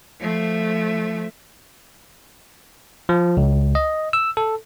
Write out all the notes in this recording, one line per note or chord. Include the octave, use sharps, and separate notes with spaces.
F3 A3
F3
C#2
D#5
E6
A4